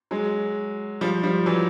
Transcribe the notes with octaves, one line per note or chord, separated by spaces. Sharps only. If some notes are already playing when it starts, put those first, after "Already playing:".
F#3 G#3
F3 G3
F3 G3
E3 F#3